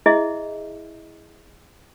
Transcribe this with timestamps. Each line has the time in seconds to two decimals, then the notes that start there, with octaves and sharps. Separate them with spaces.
0.06 E4 G#4 D#5 E5